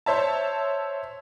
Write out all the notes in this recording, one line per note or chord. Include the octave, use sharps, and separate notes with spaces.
C5 C#5 E5 A5